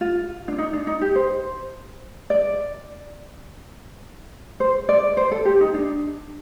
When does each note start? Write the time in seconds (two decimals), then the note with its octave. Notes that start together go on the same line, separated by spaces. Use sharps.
0.01 F4
0.48 D4
0.58 D#4
0.73 D4
0.87 D#4
1.01 G4
1.15 C5
2.30 D5
4.60 C5
4.89 D5
5.17 C5
5.31 A4
5.45 G4
5.61 D#4
5.74 D4